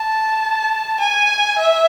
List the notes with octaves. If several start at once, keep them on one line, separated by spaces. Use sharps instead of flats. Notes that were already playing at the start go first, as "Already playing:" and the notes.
Already playing: A5
G#5
E5